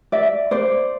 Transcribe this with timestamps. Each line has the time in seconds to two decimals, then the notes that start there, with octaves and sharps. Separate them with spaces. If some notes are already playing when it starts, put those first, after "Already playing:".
0.12 D5 E5
0.51 C5 D5